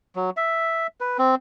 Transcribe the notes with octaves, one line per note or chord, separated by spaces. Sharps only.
F#3
E5
B4
C4